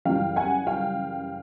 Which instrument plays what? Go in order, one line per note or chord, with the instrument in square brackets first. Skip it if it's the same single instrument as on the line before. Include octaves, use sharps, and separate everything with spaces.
[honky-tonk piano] F#2 C#3 E3 G3 F5 G5
F#5 G#5
F5 G5